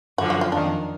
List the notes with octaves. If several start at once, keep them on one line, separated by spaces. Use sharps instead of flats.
F#2 D3 F3 F#4
F#4
F4
F2 D#3 A#3 D4